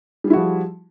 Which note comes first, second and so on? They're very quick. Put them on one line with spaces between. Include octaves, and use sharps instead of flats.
G3 G#4 E4 F#4 F3